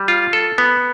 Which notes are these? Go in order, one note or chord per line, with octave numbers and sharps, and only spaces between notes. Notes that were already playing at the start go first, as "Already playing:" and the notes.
Already playing: G3
F4
A4
B3